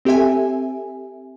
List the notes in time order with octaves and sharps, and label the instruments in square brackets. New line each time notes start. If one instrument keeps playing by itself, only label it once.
[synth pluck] C4 G4 A4 E5 G#5